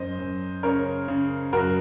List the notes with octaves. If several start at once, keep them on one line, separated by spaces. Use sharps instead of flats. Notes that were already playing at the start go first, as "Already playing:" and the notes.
Already playing: F#2 C5 D#5
F#2
C#3 A#4 C#5
C#3
F#2 F#4 A#4